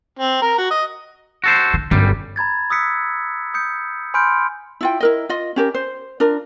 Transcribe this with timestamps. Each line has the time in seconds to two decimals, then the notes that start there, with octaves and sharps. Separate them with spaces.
0.19 C4
0.42 A#4
0.58 F#4
0.71 D#5
1.44 F#4 A4 C5
1.73 D3
1.91 G1 F#2 G3
2.36 A#5 B5 G#6 A6
2.70 D#6 E6 F#6 B6 C#7
3.54 D#6 G6 C#7
4.14 G#5 B5 C6 F6 G6 D7
4.81 E4 F4 G5
5.00 E4 A#4 D#5
5.29 F4 D#5
5.56 C#4 G4 A#4
5.74 C5
6.20 D4 F4 A#4